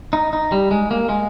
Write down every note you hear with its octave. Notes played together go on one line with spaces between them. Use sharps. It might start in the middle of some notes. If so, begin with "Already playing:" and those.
D#4
D#4
G3
G#3
A#3
G#3